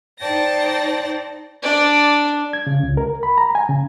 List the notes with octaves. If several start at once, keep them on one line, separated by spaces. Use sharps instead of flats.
D#4 C5 D5 G5 A5 A#6
D4 D5
G#6
C#3
C#2
A#4
B5
A#5
G#5
C#3